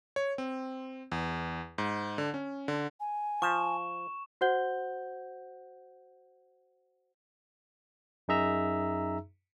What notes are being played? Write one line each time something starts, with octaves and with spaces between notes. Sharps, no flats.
C#5
C4
E2
G#2
D3
C#4
D3
G#5
F3 C#6 E7
F#4 C5 F#5 G6 G7
F#2 D#4 G#4 E5 A#5 E6